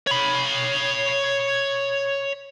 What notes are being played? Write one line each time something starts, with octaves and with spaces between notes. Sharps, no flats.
C#5 B5